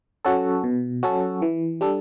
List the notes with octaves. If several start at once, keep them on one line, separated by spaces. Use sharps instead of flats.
F#3 C#4 F#4 A4
B2
F#3 C#4 F#4 A4
E3
G3 D4 A4